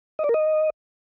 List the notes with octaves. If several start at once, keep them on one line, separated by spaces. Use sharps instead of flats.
D#5
D5
A#4
D#5